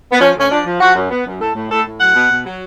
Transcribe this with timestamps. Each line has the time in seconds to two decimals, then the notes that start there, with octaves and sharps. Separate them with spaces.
0.12 B3
0.20 F3 C#4
0.35 D2 C#4
0.51 F3 D4
0.65 F3
0.80 F3 F#4
0.95 F#2
1.10 B3
1.26 F#2
1.40 A2 A4
1.55 A2
1.70 A2 A4
1.85 A2
2.00 F#3 F#5
2.15 B2
2.30 B2
2.46 F#3